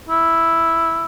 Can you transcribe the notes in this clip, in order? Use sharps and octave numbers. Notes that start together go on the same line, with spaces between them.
E4